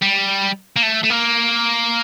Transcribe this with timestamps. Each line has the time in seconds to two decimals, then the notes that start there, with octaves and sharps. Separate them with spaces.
0.02 G3
0.76 A#3
0.83 A3
1.04 A3
1.10 A#3